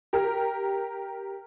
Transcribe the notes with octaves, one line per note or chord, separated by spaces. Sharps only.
G4 A#4